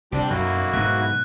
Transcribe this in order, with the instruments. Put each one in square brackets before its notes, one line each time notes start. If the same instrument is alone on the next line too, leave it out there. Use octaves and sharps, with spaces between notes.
[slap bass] C2 [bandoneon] C4 D4 [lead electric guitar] G4 D5
[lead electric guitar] B1 [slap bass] F#2 F#3 [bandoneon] A#3 E4 F#4
[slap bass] G#2 B2 [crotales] F#6